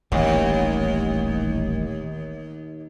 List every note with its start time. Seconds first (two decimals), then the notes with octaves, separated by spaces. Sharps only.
0.12 D#1 A1 D#2 A2